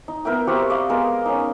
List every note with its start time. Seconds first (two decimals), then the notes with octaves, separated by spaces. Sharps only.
0.08 D#4
0.25 B3 A#4 E5 G5
0.47 C4 F#4 G4 A#4
0.70 D5 D#5 F5 B5
0.89 G#3 B3 A#4
1.25 C#4 D#4